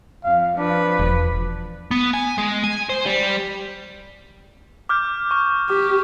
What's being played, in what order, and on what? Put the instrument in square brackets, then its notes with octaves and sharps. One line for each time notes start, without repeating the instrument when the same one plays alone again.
[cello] F2 [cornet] F5
[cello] F3 B4 [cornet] D4
[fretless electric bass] E1
[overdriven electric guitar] B3
G#5
G#3
G#5
C5
G3
[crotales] D6 F6 G6
C#6 F6
[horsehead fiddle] G4 [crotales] D6